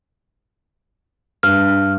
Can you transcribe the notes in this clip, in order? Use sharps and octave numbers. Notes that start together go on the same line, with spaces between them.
G2 F6